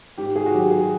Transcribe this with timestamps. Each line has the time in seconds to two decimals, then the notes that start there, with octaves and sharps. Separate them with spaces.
0.18 G#2 G4
0.36 G#4
0.46 F#4
0.53 D#3 F#3 G4
0.71 G#4